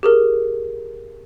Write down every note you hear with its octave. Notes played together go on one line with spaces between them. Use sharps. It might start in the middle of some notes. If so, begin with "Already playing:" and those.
G4 G#4 A#4